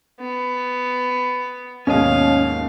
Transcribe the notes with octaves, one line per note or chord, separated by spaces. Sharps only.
B3
D#2 G#2 B2 C#4 C#5 D#5 F5